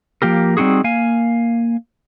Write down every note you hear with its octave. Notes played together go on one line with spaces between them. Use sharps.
F3 A#3 G4 A#4
G3 C4 D#4 F#4 G#4
A#3 F5 G#5